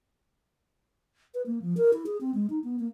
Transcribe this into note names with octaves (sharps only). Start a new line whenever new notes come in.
B4
A#3
F3
A#4
E4
G#4
C4
G#3
D#4
B3
A#3